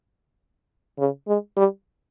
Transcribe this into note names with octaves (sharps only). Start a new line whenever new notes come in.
C#3
G#3
G3